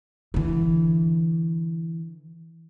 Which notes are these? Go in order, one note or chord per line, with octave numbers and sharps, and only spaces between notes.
D3 E3